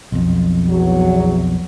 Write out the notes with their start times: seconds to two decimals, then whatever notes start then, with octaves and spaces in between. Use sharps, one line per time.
0.12 B1 F2
0.70 E2 F#3